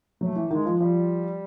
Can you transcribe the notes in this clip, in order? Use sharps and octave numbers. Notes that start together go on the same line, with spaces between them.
F#3 A3
E3
D#3 G#3
F3
F3 G3